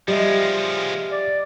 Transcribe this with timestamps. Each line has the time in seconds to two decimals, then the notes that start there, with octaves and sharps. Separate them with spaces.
0.08 F3 G3 G#3 G4 D#5 E5
1.11 D5